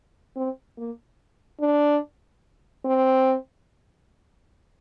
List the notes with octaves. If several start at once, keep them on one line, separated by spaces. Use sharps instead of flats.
C4
A#3
D4
C4